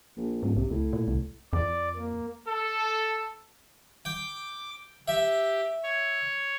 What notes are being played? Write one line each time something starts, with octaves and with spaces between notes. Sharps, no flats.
A#1
D#1 G#2
B1 C3
C#2 A2
A#2
C2
F2 D5
A#3
A4
G5 D6
G4 E5
C#5